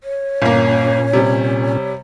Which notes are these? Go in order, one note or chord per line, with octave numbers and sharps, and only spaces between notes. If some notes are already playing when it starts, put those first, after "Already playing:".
C#5
G1 A#2 A#3 C#4
C3 G3